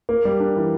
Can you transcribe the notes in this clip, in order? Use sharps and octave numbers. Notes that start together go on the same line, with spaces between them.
A#3
G3
D4
E3